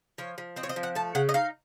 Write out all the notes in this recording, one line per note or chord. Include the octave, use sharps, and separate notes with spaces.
F3 C#5
F3
C4 D#5
C#5
D#5
F3
F#5
A3 A5
C#3 F#5
D#5
D#4 F5